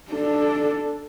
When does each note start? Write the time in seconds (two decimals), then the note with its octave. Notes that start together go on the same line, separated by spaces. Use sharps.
0.10 D4 A4